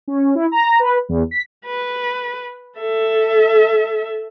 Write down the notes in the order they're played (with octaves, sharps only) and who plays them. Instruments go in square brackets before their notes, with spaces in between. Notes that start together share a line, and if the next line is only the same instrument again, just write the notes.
[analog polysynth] C#4
E4
A#5
B4
E2
B6
[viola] B4
A4 E5